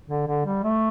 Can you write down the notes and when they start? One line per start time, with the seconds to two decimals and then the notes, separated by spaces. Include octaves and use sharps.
0.10 D3
0.27 D3
0.46 G3
0.64 A3